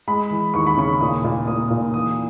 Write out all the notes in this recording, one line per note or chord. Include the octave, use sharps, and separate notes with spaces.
G#3 B5
E3
D#2 C#6
B5
C#3 C#6
A#2 D#6
A#2
A#2 D#6
A#2
E3 D#6